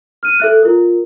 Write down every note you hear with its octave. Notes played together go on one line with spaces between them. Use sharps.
F6 D#7
A4 E5 F#6
F4 A#4